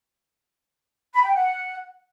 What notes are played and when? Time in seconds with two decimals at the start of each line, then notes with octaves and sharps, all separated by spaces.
1.13 B5
1.24 G5
1.34 F#5